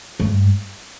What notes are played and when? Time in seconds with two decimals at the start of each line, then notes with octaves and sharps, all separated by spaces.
0.20 G2